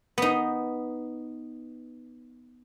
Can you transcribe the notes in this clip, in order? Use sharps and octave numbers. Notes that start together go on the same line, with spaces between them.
B3 D#4